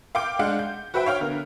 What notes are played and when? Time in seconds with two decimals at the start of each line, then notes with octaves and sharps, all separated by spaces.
0.15 F5 G5 D6 G6 D7
0.39 G#3 D4 D5 F5 F#5
0.59 G6
0.94 F#4 B4 C5 E5 F#5 G5
1.06 C#5 F5 G5 F6
1.20 D3 B3 A#4